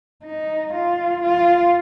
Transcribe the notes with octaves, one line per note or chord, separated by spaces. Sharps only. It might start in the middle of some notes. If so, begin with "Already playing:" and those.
D#4
F4
F4